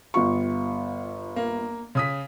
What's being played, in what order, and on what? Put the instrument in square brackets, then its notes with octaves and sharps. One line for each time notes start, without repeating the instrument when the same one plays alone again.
[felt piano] G1 F4 C#6
[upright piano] A#3
C#3 D#6 B6